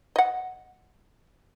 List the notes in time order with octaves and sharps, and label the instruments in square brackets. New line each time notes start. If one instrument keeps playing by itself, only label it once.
[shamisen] D#5 F#5